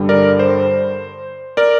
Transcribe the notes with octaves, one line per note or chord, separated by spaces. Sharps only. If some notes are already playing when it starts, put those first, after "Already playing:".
Already playing: G2 D3 G3
A#4 D5
C5
A#4 D5